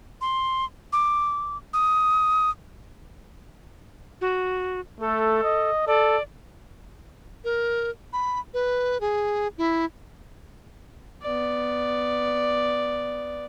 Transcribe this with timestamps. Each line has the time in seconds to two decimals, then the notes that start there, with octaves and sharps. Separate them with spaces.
0.21 C6
0.93 D6
1.73 D#6
4.21 F#4
5.00 A3 A4
5.44 D#5
5.87 A4 D5
7.44 A#4
8.13 B5
8.54 B4
9.01 G#4
9.58 E4
11.22 B3 D5